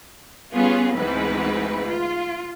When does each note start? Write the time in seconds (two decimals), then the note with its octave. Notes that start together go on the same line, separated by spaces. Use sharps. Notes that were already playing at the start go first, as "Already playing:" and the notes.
0.53 G3 B3 C#4 F4 G#4
0.95 D2 G#2 E3 B3 C4 B4
1.86 F4